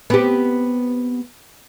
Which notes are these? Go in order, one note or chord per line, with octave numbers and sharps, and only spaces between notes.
B3 C4 G4